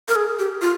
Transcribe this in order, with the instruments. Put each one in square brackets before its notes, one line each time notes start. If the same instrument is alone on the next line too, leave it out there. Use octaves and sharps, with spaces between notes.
[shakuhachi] A#4
G#4
G4
F4